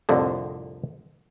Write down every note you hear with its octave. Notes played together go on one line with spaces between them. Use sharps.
C2 F2 A2 D3